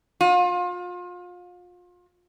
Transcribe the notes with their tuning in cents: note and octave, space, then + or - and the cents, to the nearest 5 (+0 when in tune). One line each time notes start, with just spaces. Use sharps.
F4 +30